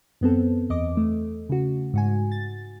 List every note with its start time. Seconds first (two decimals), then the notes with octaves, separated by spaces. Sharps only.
0.21 F#2 B3 C4 A4
0.70 E2 D#5 D6
0.97 A3
1.49 C#3 F#4
1.94 G#2 F#4 G#5
2.32 A6